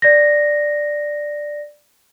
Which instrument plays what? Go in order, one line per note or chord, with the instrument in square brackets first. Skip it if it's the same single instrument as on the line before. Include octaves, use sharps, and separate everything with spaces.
[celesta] D5 A#6